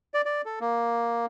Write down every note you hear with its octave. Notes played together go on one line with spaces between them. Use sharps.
D5
D5
A4
A#3